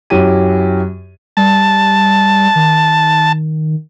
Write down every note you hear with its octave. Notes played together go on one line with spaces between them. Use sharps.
F#2 F#3 C#4 E4 G4 D#7
G3 A5
D#3